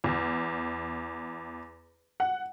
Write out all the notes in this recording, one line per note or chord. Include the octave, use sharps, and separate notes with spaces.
E2
F#5